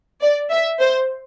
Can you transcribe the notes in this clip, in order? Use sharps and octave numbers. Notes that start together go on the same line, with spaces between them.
D5
E5
C5